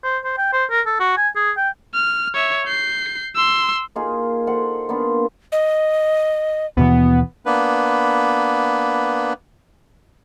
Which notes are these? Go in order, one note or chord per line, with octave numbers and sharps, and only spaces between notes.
C5
C5
G5
C5
A#4
A4
F#4
G#5
G#4
G5
F6
C#5 E5
G6 C7
C6 E6
A#3 D#4 F4 G#4
A4 C5 F#5
A#3 B3 D4 F4
D#5
D#2 B2 E3 B3
A#3 B3 D4 B4